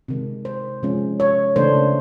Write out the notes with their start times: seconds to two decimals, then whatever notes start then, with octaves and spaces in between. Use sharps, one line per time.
0.08 C3 D#3 G#3
0.45 C5
0.83 C3 F3 G#3 C#4
1.20 C#5
1.56 C#3 E3 A3 D4 C5